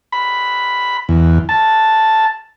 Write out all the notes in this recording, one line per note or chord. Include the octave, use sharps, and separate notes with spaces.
B5
E2
A5